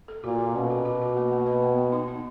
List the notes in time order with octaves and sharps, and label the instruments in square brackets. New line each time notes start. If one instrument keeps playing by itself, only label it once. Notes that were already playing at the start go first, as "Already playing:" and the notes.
[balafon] A4
[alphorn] A#2 [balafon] F#4
[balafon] A4
[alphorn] B2 [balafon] C#4
[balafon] F#4
F#4
F#4
A#3
A#3
B4
B3
B3
D#4
D#4